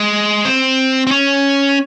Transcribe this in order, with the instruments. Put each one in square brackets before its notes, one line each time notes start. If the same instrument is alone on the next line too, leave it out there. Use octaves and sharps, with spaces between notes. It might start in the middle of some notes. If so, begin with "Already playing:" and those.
Already playing: [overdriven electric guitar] G#3
C4
C4
C#4